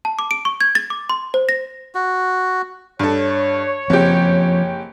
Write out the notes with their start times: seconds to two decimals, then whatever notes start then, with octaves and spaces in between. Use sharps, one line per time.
0.05 A5
0.19 D6
0.31 D7
0.45 C#6
0.61 G#6
0.75 A6
0.90 D6
1.10 C6
1.34 C5
1.49 A#6
1.95 F#4
2.99 G2 A4 C#5
3.90 F#1 F3 C4 G4